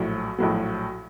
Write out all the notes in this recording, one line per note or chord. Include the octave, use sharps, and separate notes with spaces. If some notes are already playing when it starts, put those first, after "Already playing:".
Already playing: A#1 A2 F#3
A#1 A2 F#3